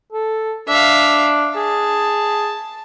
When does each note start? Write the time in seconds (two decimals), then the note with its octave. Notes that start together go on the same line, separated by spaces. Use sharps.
0.12 A4
0.68 D4 E5 F5
1.56 G#4 A5